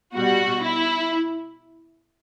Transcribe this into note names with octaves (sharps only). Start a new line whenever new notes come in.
B2 G3 F#4
E4